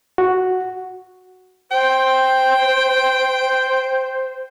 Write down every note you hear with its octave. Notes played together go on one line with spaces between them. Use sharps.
F#4
C5 G5